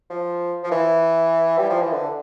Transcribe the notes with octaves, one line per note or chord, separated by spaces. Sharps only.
F3
F3
E3
G3
F3
E3
D3